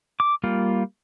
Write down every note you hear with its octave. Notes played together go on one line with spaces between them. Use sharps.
D6
G3 A#3 F4